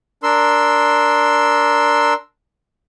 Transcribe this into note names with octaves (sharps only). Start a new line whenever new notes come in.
D4 A#4 C6 E6